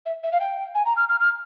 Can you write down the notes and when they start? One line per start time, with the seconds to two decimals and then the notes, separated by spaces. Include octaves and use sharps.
0.05 E5
0.23 E5
0.32 F5
0.40 G5
0.74 G#5
0.85 A#5
0.96 F6
1.08 F6
1.20 F6